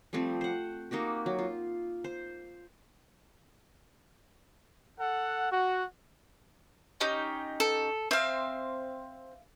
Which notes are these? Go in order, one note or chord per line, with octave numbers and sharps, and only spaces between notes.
F3 G3 A3 C4
C5 F#5
A#3 D#4 F#4 G4
F#3
F4
C5
A4 F#5
F#4
C#4 D#4 G4
A4
C4 E5 F5